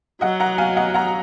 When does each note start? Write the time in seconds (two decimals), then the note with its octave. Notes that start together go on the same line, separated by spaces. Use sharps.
0.21 F#3 D#5 F#5
0.40 F#5 A#5
0.58 F5 G#5
0.77 D#5 F#5
0.94 F#5 A#5